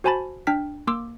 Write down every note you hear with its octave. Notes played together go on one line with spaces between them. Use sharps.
F#4 C5 G#5 A5 B5 A6
D4 G5 F6 B6
A#3 C6 D6 E6